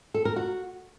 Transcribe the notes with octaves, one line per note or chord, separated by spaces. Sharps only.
A4
A#4
F#4